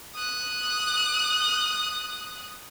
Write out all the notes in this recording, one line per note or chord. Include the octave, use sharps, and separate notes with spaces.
D#6 F#6